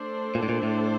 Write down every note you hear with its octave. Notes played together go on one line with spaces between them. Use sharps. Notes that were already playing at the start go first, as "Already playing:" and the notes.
Already playing: A3 D4 A4 C5
A#2
A2
A#2
A2